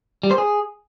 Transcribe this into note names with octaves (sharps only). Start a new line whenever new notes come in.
G3
C5
G#4